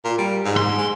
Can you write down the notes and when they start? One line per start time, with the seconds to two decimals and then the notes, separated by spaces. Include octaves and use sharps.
0.04 A#2
0.18 G3
0.45 G#2
0.57 C6
0.78 G#3